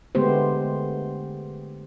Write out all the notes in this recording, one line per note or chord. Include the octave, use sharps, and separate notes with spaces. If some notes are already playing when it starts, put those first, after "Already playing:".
D3 G#3 A3 B3 G4 C5